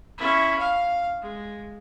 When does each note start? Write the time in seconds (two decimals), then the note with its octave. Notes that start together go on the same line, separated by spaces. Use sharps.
0.18 C#4 E4
0.58 F5
1.21 G#3